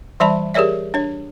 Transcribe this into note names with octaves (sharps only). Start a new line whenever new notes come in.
E3 G3 D5 E5 A5 B5
G4 G#4 A#4 C#5 D5 E5
D4 C#5